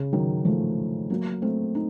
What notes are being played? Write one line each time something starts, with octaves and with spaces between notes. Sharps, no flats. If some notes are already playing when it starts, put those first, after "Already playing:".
Already playing: C#3
D#3 F#3
F3 A3
F#3 A#3
A3 C4
D#4